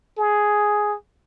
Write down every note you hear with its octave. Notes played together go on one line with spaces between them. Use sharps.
G#4